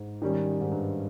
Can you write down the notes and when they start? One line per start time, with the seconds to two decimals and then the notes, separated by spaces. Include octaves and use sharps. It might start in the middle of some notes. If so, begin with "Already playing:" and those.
Already playing: G#2
0.22 D#3 G3 C#4
0.61 G#2
0.72 G2